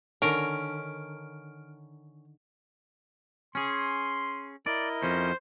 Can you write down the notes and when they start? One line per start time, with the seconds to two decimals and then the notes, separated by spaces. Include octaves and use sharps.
0.22 D3 D#3 C#4 A#4 F6 D7
3.55 C#4 G#4 C6
4.66 E4 A#4 D5 D#5
5.02 F2 C#4 C5